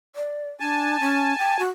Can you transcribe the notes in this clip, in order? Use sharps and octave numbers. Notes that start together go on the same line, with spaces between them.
D5
D4 G#5 A5
C#4
G5
F#4